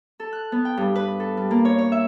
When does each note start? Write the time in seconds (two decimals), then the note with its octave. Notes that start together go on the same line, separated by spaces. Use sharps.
0.20 A4
0.33 F#6
0.52 B3
0.65 G5
0.77 G2
0.95 B4
1.20 A4
1.37 G3
1.51 A#3
1.65 C#5
1.78 C#5
1.92 E5